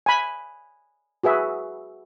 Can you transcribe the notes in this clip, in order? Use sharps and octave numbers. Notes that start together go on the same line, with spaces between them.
G#5 B5
F#4 G#4 B4 E5